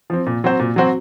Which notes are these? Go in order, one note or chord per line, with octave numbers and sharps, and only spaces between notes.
F3 C4
A#2
F#3 C4 F#4 C5
A#2
F#3 C4 F#4 C5